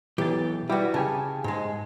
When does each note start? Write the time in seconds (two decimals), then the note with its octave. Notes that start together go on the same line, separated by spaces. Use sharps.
0.18 B1 E3 G4 A6
0.70 G3 E4 F#4 G4 B4
0.94 C#3 G4 G#5 A5
1.44 G#2 G#3